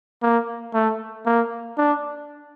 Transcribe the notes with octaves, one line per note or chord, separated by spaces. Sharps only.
A#3
A3
A#3
D4